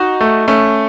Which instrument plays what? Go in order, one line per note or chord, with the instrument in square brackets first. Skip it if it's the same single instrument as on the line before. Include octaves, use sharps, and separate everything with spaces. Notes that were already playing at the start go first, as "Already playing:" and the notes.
Already playing: [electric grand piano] D#4 [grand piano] F#4
[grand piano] A3
[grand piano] A3 [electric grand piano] C#4